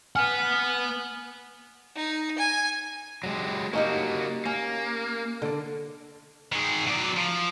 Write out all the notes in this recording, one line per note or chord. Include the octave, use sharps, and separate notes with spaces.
B4 F#5 G#5 F6
D#4
G#5
F#3 G#3 G4
A#3 C#4 D#4 F#4 G4
A#3 C#4
D3 D5
D#3 G#4
F#3 D5
F3